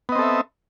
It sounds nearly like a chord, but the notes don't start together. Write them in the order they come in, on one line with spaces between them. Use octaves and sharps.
B3 D#5 C4 A4 E5